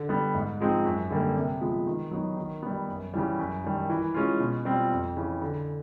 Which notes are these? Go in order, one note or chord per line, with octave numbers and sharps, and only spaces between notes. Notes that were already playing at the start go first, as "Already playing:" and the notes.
Already playing: D3
G3 B3
G#2
F3 G#3 C4 D#4
F#2
D3 G3 A#3
C3
F3 G#3 B3
D#3
F#3 B3 D#4
D#3
G3 B3
F#2
C#3 E3 G3
F#2
D#3 G3
E3
G#3 C#4 F4
B2
G3 C4 F4
F2
C#3 E3
D3